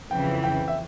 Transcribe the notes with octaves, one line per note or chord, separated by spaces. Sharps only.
F2 C#3 E3 G5
G5
E5